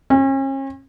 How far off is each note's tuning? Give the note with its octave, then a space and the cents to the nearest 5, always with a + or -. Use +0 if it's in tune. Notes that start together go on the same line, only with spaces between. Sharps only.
C#4 -40